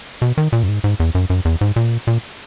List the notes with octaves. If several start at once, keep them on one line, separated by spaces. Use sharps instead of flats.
B2
D#3
A#2
F#2
G#2
G#2
E2
F#2
F#2
E2
G#2
A#2
A#2